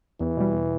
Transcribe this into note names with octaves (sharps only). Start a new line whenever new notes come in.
E2 E3
B2 G3
E2